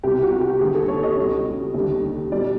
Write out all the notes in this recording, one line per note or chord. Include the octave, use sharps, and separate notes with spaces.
C2 B2 G3 G4
F#4
F#4
G4
D#2 D3 G3 G#4
A4
C#5
D#5
C#2 B2 G3
D#2 D3 G3
B2 G3 D5